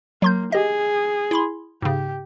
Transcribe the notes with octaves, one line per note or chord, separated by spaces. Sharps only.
F#3 A#3 C6 G6
G4 G#4 D#5
E4 B5 C6
G#2 C#3 G4